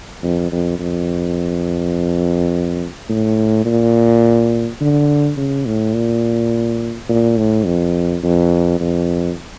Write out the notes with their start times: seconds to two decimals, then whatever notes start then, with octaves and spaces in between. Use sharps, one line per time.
0.23 F2
0.52 F2
0.80 F2
3.09 A2
3.65 A#2
4.81 D3
5.37 C#3
5.66 A2
5.94 A#2
7.09 A#2
7.37 A2
7.66 F2
8.24 F2
8.80 F2